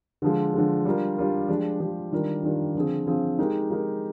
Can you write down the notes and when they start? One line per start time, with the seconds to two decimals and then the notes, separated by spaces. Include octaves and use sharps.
0.22 D3 F3 G#3
0.54 D3 F3 G#3
0.85 G3 D4 F4 A#4
1.17 G3 D4 F4 A#4
1.48 F3 G#3 D4 G4
1.80 F3 G#3 D4 G4
2.12 D#3 G3 D4 F4 A#4
2.43 D#3 G3 D4 F4 A#4
2.75 D3 F3 C4 F4 G#4
3.06 D3 F3 C4 F4 G#4
3.38 G#3 D#4 G4 A#4
3.70 G#3 D#4 G4 A#4